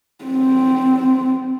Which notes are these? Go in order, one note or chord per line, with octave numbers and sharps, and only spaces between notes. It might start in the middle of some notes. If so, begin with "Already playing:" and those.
C4